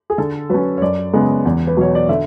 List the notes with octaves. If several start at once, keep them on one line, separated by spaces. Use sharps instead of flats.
G#4
D3 A4
F#3 C#4 B4
C#5
F#2 D5
C#3 G#3 B3
E2
B4
B2 F#3 C#5
D5
D3 E5